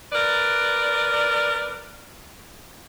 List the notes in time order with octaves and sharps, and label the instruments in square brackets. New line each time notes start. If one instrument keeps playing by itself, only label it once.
[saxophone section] A#4 B4 D5